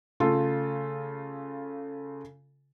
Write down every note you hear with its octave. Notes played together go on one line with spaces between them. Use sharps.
C#3 A3 F4 A4